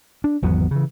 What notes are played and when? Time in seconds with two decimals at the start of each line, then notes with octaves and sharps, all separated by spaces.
0.24 D4
0.42 G#1 E2 F#3 B3
0.71 C#3 E3